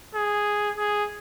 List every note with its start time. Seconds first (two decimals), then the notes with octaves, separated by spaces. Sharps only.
0.15 G#4
0.77 G#4